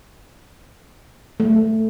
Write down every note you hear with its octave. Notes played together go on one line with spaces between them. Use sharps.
A3